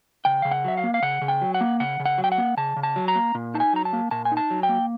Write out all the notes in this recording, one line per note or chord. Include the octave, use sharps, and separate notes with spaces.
C#3 G5
C#3 F5
F#5
F#3 E5
F5
A#3
F5
C#3 F#5
C#3
G5
F#3
F#5
A#3
C#3 F#5
C#3
F#5
F#3
G5
F#5
A#3
C#3 A5
C#3
A5
F#3
A#5
A#3
A#2
D#4 A5
G#5
F#3 A#5
A5
A#3
A#2 A5
G#5
D#4
A5
F#3
G5
A#3